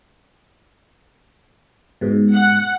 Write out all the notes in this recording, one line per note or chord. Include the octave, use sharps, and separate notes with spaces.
G#2 B2
F#5